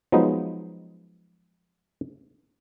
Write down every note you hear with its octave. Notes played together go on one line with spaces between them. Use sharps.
F3 F#3 G#3 B3 D#4